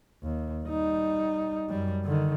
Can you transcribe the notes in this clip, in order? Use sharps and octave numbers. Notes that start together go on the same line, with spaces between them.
D#2
G3 D#4
F#2 G3
D3 D#3